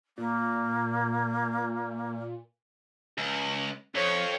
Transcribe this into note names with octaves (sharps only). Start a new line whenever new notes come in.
A#2 A#3
C#2
F2 C#5